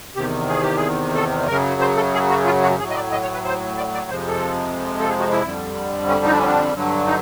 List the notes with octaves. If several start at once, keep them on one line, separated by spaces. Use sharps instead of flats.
E2 C3 D#3 G4
G#4
G4
G#4
A4
F#2 C#3 F#3 A#4
C5
A4
G#4
F#4
F4
F#4
A2 F#3 G#4
D#5
D5
D#5
C#5
B4
C5
D5
D5
F2 C3 F3 G#3 C5
A4
A4
G#4
F#4
E4
F2 D3 G3
C#4
D#4
D4
C#4
D4
G2 D3 F#3
D#4